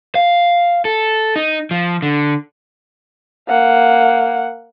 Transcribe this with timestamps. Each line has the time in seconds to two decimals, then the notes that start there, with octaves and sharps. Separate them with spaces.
0.15 F5
0.85 A4
1.36 D#4
1.71 F3
2.02 D3
3.48 A#3 F#5